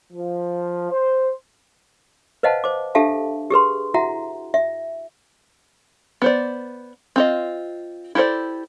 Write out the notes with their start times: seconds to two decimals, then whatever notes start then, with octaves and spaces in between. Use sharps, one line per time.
0.13 F3
0.90 C5
2.43 B4 C5 D#5 F5 F#5 A5
2.64 C5 D6
2.95 D4 G4 A4 E5 F5 A5
3.51 G4 G#4 B4 C6
3.94 E4 F#4 E5 F#5 A#5
4.54 E5
6.22 B3 C5 D5
7.16 C4 F4 D#5
8.15 E4 G4 A4 C5 D5